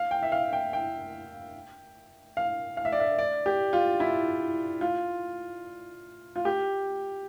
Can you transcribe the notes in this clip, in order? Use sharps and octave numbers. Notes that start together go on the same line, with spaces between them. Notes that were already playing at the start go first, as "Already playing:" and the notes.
Already playing: F5
G5
E5
F5
G5
G5
F5
F5
E5
D5
E5
D5
G4
F4
E4
F4
F4
G4